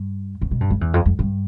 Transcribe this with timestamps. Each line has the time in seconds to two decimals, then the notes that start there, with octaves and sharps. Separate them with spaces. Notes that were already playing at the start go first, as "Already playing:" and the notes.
Already playing: G2
0.41 E2
0.51 B2
0.61 G2
0.70 F2
0.81 E2
0.94 F2
1.06 F2
1.19 G2